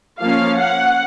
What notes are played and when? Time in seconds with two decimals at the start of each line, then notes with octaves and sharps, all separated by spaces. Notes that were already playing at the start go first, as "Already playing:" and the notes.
0.19 F3 A#3 C#4 F5
0.58 F#5